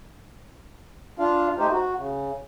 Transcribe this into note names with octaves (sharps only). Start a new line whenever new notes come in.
D4 F4 F5
A3 D#4 G4 C5
F#4
C#3